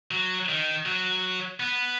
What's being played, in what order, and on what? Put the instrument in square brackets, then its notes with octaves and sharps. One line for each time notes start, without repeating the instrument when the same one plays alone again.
[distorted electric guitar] F#3
D#3
F#3
B3